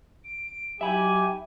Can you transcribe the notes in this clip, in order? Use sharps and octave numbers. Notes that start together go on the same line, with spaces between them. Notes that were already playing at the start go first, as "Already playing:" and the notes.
D7
F#3 D#4 G4 E5 G#5 B5